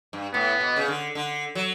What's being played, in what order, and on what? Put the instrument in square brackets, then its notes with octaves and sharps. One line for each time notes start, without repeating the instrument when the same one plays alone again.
[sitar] G2
[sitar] A2 [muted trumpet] B3
[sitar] B2
C#3
D3
D3
F#3